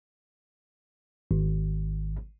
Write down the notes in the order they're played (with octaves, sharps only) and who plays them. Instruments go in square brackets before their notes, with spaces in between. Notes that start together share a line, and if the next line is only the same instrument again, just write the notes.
[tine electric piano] G#1